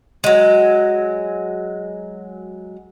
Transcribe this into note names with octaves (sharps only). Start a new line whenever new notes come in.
F#3 G#3